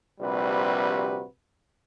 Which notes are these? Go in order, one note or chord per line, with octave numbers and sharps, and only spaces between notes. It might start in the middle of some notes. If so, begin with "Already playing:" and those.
A#1 C3 G3 F#4 B4